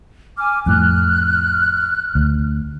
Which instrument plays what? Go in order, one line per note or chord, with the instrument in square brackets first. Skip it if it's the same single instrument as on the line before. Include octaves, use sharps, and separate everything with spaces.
[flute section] G#5 D6 F6
[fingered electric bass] F2 A2 [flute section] F6 F#6
[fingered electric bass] D2